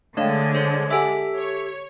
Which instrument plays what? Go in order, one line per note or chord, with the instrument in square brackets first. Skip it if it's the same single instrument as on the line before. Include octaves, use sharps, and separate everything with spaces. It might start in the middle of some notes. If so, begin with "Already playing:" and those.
[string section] D3 G#3 [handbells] A3 D4 C#5 [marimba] D#5 F5 G5
[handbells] C5 C#5
[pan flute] G4 [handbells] A4 E5 [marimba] F#5 G#5 E6
[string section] C#5